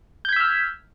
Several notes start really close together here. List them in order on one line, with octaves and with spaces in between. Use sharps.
G6 G#6 B6 E6 F6